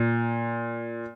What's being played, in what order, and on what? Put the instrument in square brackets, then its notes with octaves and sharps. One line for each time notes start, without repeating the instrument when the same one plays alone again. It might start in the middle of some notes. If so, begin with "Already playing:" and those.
Already playing: [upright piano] A#2